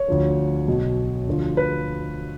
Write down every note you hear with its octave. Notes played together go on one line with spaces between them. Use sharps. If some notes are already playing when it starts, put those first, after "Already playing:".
Already playing: C#5
D2 D3 F3
B1 B2
D2 D3 F3
B4